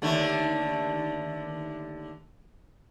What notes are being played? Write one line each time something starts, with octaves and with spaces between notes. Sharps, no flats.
D#2 D3 A3